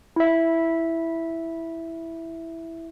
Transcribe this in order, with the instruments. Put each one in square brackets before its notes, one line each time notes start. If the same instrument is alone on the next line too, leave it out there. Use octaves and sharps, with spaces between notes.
[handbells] E4 E5